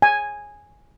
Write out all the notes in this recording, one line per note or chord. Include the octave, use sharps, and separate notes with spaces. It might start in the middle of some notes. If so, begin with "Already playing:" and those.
G#5